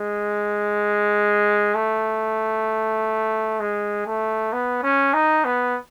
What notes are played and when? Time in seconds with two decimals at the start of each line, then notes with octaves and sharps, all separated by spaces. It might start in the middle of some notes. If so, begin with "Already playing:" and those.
Already playing: G#3
1.75 A3
3.60 G#3
4.06 A3
4.53 B3
4.83 C#4
5.14 D#4
5.45 B3